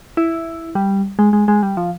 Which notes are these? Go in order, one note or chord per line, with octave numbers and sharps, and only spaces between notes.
E4
G3
G#3
G#3
G#3
G3
F3